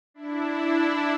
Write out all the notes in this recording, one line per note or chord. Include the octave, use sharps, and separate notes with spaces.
D4 E4